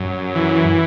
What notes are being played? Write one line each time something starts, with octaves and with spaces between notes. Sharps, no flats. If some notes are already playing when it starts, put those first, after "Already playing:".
Already playing: F#2
E3